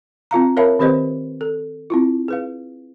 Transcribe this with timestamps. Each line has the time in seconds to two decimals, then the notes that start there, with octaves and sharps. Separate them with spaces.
0.31 C4 F4 F5 A#5
0.57 A#4 C#5 E5 F5 A5 B5
0.79 D#3 C4 G4 B4 C5 D#5
1.41 A4
1.90 C4 E4 F4
2.28 G#4 B4 F5